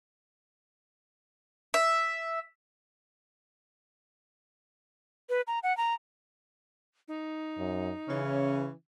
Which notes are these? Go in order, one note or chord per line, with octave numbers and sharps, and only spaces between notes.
E5
B4
A#5
F#5
A#5
D#4
F#2
C#3 E3 C#4